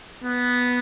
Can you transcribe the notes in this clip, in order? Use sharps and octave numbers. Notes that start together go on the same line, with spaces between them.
B3